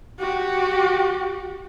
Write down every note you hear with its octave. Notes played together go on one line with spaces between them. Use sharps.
F#4 G4